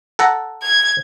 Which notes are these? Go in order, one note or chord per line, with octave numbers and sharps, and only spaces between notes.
A4 F#5 A#5
G#6